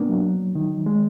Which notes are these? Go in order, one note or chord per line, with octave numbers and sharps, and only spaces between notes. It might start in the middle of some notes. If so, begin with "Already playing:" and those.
Already playing: A#3 B3 D4
F#3
D#3
G#3